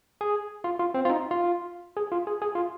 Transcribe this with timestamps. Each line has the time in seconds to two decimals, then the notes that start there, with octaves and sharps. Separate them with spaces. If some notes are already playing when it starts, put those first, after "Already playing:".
0.21 G#4
0.64 F4
0.79 F4
0.94 C4
1.05 F4
1.10 D#4
1.31 F4
1.97 G#4
2.12 F4
2.27 G#4
2.42 G#4
2.55 F4